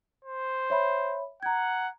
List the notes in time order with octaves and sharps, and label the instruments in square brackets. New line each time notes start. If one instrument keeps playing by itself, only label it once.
[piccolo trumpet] C5
[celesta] C#5 E5 B5
[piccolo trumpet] F#5 [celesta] A#5 G#6